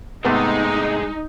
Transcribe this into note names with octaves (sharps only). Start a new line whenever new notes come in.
G#2 C3 G#3 A3 B3 D#4